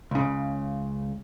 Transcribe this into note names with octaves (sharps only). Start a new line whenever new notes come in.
C#2 C#3